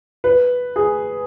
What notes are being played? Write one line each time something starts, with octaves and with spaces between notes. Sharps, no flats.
B4
G#4